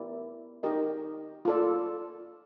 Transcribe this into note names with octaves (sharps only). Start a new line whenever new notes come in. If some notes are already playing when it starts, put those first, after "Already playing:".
Already playing: B3 E4 G4 A#4 D5
D#4 G4 A#4 D#5
F4 A4 D5